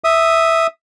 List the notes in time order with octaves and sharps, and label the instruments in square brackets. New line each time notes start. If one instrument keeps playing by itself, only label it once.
[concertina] E5 D#6